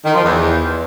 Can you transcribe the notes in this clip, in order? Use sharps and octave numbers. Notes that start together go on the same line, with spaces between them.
D#3
F3
E2